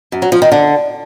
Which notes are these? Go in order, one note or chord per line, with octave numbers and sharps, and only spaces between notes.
F#2
F#3
F3
D#3
D3